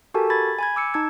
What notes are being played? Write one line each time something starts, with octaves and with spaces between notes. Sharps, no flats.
F#4 G4 A4 A#4 G#5 A5
B5 G#6 A6
G#5 B5 G#6
D6 E6 C#7
D#4 A5 E6 G#6